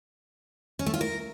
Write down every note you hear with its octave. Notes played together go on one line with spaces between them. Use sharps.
C#4
A3
F4
A#4